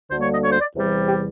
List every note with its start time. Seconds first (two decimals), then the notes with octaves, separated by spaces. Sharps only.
0.10 D2 D3 G3 A#3 C5
0.21 C#5
0.32 D#5
0.43 C#5
0.51 C5
0.59 D5
0.76 E2 C3 E3 G3
1.08 G4